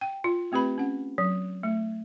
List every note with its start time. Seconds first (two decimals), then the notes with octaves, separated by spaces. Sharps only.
0.01 G5
0.24 F4
0.52 A3 C4 G4 B4 B5
0.78 C#4 F#5
1.18 F#3
1.63 A3